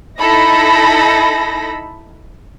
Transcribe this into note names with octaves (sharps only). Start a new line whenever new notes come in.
D#4 E4 A4 B5 A#6